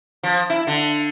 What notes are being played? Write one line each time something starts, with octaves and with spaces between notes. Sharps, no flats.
F3
E4
D3